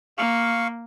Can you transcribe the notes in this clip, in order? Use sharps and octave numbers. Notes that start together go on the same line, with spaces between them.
A#3 F5 C#6